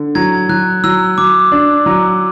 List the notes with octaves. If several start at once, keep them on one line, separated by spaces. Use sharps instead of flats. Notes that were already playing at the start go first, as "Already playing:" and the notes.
Already playing: D3
F#3 G#6
F#3 F#6
F#3 E6
F#3 D6
D4
F#3